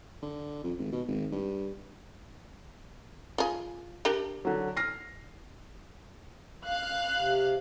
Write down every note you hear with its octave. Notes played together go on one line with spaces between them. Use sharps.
D3
F2
G#1
B2
G#1
G2
F4 G#4
D4 G4 A#4
D3 F#3
F6 A#6 C7
F5 F#6
C3